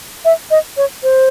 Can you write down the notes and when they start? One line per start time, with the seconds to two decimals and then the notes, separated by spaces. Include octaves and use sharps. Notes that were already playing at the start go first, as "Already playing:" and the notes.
0.25 E5
0.51 D#5
0.77 C#5
1.03 C5